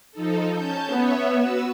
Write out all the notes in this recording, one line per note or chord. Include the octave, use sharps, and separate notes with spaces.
F3 D#4 A4
C#4 A5 G6
B3 C#5 E5
F#4 B4 E6